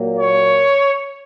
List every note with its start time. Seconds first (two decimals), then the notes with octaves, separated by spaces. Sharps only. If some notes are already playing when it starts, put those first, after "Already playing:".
Already playing: A#2 F#3 A#3
0.18 C#5